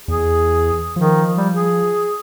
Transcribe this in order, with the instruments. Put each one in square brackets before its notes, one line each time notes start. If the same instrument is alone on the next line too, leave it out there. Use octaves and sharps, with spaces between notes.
[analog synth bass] E2 [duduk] G#4
[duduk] D#3 [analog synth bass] F3
[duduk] G3
G#4